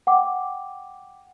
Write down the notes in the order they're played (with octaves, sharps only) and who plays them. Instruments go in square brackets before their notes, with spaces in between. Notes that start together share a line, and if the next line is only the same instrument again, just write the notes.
[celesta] F#5 G5 D6